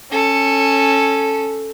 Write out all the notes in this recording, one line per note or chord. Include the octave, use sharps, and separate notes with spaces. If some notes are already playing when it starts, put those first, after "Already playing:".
C#4 A4